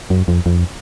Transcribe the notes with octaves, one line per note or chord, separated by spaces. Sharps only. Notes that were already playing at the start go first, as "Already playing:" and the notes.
F#2
F2
F2